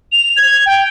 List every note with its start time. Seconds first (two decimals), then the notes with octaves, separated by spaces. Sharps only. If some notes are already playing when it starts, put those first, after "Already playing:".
0.12 F7
0.37 G#6
0.66 G5